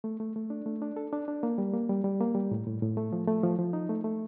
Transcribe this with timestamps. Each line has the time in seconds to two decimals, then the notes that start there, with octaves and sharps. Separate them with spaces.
0.04 A3
0.20 A3
0.36 A3
0.50 D4
0.66 A3
0.82 D4
0.96 A4
1.13 D4
1.28 D4
1.43 A#3
1.58 G3
1.74 A#3
1.89 G3
2.04 G3
2.21 A#3
2.35 G3
2.51 A2
2.67 A2
2.82 A2
2.97 A3
3.13 F3
3.27 A3
3.44 F3
3.59 F3
3.73 D#4
3.89 A3
4.04 A3